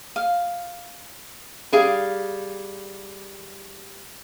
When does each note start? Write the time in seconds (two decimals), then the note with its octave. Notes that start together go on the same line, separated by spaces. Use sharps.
0.16 F5
1.73 G3 G#4 F5